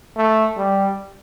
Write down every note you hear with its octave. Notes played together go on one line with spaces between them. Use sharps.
A3
G3